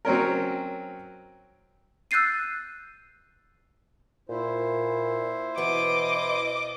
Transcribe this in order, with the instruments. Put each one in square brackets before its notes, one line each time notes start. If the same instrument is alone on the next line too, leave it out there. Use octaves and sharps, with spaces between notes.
[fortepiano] F#3 C4 C#4 A#4
[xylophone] E6 F#6 G6 A6 C7 D#7
[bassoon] A#2 [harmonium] E4 C5
[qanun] B2 C#6 [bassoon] E3 [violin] D#5 D6